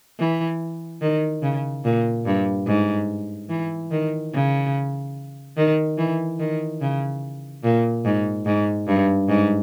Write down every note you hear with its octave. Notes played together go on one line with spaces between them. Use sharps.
E3
D#3
C#3
A#2
G2
G#2
E3
D#3
C#3
D#3
E3
D#3
C#3
A#2
G#2
G#2
G2
G#2